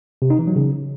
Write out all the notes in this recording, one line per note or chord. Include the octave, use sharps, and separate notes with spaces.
C3
D#4
E3
F#3
C#3